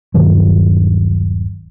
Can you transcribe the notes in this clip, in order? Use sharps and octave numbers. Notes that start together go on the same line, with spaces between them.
D#1 G2 D#3 F#3